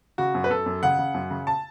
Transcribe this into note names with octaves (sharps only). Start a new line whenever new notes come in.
C#3 F#4
F#2
B4
F#2 A4
F#2
C#3 F#5
C#3
F#2
C#3
A5